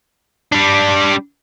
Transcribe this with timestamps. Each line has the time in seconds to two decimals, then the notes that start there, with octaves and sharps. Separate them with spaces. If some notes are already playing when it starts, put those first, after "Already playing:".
0.52 G3 D4